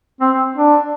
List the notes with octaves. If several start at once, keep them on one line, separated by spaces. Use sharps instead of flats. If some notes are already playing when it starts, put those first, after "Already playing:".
C4
D4